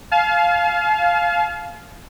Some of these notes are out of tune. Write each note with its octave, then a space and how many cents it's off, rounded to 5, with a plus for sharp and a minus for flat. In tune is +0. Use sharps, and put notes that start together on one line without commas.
F5 +0 A5 -45